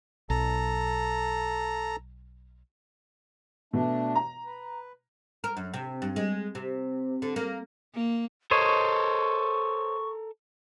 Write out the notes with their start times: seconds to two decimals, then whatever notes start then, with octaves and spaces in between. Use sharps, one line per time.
0.30 B1 A4 A#5
3.73 B2 A3 D4
4.15 A#5
4.45 B4
5.44 A#4
5.57 F#2
5.74 C3
6.02 G2
6.16 G#3
6.55 C3
7.22 D3
7.36 A#3
7.94 A#3
8.51 A4 A#4 C5 C#5 D#5 C#6